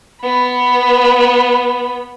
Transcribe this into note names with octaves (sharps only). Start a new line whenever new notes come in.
B3 B5